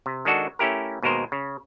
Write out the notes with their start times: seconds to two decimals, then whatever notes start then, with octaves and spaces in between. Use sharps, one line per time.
0.06 C3
0.25 D#3 G#3 D4 F#4 A4
0.59 A3 C#4 E4 G4 A#4
1.02 D#2 B2 G#3 A#4 C5
1.32 C#3